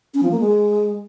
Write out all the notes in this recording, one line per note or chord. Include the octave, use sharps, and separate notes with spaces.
C#4
F3
A#3
G#3